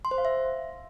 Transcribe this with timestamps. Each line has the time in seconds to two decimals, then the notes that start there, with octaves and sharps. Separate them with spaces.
0.05 C6
0.11 C5
0.18 F5
0.25 E5